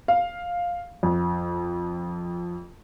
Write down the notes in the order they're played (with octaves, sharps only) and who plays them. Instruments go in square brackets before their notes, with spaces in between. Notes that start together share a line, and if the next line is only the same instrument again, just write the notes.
[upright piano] F5
F2